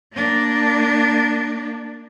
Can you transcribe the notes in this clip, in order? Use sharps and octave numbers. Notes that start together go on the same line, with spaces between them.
A#3 D4